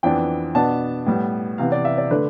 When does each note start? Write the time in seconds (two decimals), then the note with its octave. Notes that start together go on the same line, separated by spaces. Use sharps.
0.03 F2 E3 B3 D4 G5
0.55 B2 B3 D4 A5
1.06 A2 G3 B3
1.58 C3 E3 B3 F5
1.72 D5
1.85 E5
1.98 D5
2.11 D3 A3 D4 B4